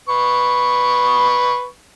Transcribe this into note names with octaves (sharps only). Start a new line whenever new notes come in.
B4 C#6